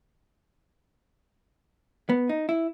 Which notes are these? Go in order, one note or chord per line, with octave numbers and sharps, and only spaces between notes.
B3
D#4
E4